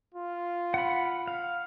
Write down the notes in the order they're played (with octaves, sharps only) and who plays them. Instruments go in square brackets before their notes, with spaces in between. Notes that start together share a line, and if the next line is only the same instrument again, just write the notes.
[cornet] F4
[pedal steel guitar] F#5 B5
F5